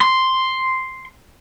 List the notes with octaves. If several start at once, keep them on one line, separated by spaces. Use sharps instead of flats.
C6